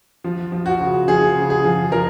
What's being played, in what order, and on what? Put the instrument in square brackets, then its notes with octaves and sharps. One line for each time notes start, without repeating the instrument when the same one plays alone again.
[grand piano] F3
F3
F#4
C#3
F3 G#4
C#3
G#4
F3
F3 A#4